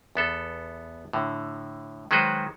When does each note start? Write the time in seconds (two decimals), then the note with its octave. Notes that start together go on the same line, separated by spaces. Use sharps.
0.15 E2 B3 A4
1.13 A2 D3
2.11 D#3 F#3 G#3 F#4 B4 C5